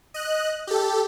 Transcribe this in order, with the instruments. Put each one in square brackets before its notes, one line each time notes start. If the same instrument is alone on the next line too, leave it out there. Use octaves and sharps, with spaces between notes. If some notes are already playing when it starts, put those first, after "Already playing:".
[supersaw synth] D#5 F#6
G4 A4